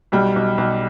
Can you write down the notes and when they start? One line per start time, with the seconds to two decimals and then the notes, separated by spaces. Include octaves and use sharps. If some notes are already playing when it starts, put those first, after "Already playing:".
0.12 B1 G3
0.36 B1
0.58 B1